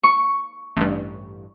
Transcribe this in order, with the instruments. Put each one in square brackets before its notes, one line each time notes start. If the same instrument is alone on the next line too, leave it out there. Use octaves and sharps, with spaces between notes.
[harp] C#6
[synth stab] A1 G2